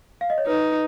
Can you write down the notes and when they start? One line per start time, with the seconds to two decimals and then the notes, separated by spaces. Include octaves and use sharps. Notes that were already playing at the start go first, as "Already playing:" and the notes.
0.21 F5
0.30 D#5
0.38 C#5
0.47 D#4 B4